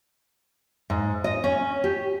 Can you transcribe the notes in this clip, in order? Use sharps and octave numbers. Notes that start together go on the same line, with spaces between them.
G#2
D#5
C#4
G4